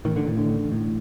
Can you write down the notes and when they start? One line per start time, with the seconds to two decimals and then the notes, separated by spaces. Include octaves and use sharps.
0.05 A1 D#3
0.16 D3
0.27 A2
0.37 D3
0.49 A1
0.72 A2